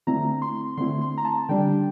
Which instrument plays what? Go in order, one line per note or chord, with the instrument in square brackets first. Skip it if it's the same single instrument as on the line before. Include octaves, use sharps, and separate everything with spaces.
[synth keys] D3 A3 C4 E4 A#5
C6
D3 A3 C4 E4 C6
C6
A#5
A5
D3 G3 D4 G5